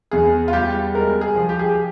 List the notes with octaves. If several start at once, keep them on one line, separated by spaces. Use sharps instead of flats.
E2 G#4
F4
G3 G4
G#3 A#4
G#4
F3
G4
G#4
G4